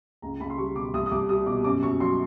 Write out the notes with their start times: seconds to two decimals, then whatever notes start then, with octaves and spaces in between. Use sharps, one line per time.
0.22 C#2 A#5
0.40 C#2 B5
0.50 C6
0.58 G3 C#6
0.75 B2 D6
0.93 C2 D#6
1.06 D#6
1.11 C2 D6
1.29 G3 D#6
1.47 B2 D6
1.64 F#2 D6
1.83 F#2 C#6
2.00 F#3 C6